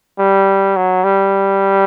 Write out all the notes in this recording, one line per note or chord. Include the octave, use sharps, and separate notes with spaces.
G3
F#3
G3